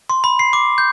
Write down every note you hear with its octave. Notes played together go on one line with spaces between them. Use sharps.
C6
B5
C7
D6
G6